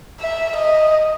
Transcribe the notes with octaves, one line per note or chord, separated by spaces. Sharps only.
E5
D#5